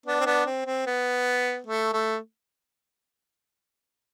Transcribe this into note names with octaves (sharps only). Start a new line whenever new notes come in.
B3 D4
C4
B3 D4
C4
C4
B3
A3
A3